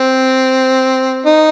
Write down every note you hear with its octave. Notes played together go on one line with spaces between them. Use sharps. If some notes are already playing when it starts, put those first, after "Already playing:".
Already playing: C4
D#4